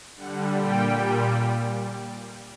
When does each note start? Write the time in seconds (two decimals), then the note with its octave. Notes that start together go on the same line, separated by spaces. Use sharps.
0.16 D3 G3 F#5
0.52 A#2 G3 G5
0.88 A#2 G3